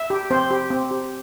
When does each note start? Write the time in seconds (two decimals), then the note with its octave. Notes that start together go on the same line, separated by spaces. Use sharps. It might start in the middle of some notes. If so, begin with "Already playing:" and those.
Already playing: E5
0.10 G4
0.31 C4 C5
0.51 G4
0.70 C4
0.91 G4